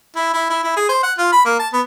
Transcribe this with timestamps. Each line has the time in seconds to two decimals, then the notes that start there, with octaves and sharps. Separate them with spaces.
0.15 E4
0.34 E4
0.50 E4
0.63 E4
0.77 G#4
0.89 C5
1.03 F#5
1.18 F4
1.32 B5
1.45 A#3
1.59 A5
1.73 B3